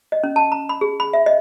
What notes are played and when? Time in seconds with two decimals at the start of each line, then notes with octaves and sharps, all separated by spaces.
0.12 D#5
0.24 C#4
0.36 A5
0.52 A#5
0.69 B5
0.81 G#4
1.00 B5
1.13 E5
1.26 D#5